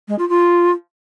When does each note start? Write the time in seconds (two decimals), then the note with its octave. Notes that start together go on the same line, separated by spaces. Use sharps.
0.08 G#3
0.18 F4
0.29 F4